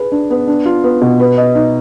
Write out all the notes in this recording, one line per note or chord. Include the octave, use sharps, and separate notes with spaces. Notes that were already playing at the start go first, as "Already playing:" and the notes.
Already playing: G#4 B4
D4
B3
D4
F4
B3
B2
B4
D#5
D#4